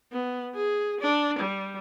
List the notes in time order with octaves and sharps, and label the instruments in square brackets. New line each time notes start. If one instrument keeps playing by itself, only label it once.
[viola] B3
G#4
D4
G3